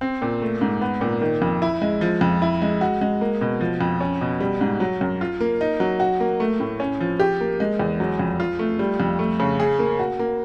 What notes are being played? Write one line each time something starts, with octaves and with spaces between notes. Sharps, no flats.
C4
A#2
A3
G#2
B3
A#2
D#3
F2
E4
G#3
F3
F2
E4
G#3
F#4
G#3
A#3
B2
F3
F2
C#4
B2
G3
G#2
F#3
F#2
F4
A#3
D#4
F#3
F#4
A#3
A3
A2
C#4
F3
G4
A#3
G#3
E2
F#3
F2
F4
A3
G3
F2
A3
C#3
G#4
A#3
F#4
A#3